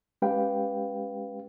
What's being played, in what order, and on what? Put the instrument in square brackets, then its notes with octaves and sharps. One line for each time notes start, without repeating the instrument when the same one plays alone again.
[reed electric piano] G#3 C#4 G4 B4 F5 G5